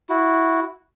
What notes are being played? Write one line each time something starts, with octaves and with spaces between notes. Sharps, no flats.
E4 F#4